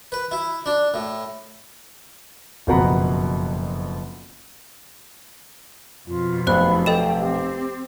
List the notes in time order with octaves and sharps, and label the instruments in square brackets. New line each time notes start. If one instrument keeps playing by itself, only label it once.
[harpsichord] B4
E4
D4
A2
[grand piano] F#1 F2 B2 F#5 A#5 B5
[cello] F2 B2 [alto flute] F4
[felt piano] F1 B1 [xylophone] C5 F#6 [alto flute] B5
[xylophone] A4 D#5 E7 [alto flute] G5
[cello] C4 [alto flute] G4